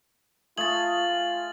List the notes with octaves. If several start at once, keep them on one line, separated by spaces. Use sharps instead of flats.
A3 F4 G#4 A6 F#7